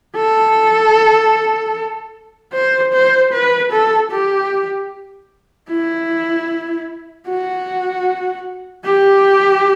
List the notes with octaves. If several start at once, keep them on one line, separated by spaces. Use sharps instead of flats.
A4
C5
C5
B4
A4
G4
E4
F#4
G4